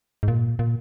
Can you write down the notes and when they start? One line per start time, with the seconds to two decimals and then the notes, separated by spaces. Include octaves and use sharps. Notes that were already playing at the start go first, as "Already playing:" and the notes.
0.23 G#2
0.28 A#2
0.59 A#2